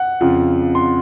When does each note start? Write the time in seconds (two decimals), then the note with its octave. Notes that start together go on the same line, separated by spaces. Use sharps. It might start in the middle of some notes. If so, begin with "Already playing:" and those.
Already playing: F#5
0.21 F2 C#3 F3
0.75 C6